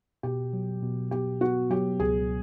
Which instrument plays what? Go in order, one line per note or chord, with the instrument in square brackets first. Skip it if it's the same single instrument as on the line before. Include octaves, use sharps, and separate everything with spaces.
[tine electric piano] B2 [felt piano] G4
[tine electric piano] F#3
B2
[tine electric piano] B3 [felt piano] G4
[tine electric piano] B3 [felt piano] F#4
[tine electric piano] F#3 [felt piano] G4
[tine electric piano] C#2 [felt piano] G#4